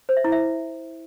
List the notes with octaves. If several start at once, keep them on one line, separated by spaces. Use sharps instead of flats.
C5
E5
E4
E5